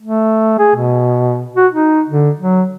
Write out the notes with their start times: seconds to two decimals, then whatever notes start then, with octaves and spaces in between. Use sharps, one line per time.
0.02 A3
0.59 G#4
0.75 B2
1.56 F#4
1.72 D#4
2.09 D3
2.39 F#3